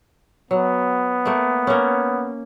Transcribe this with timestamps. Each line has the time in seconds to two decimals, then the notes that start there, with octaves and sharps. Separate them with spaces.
0.51 F#3 B3
1.25 A3 A#3
1.67 A#3 C#4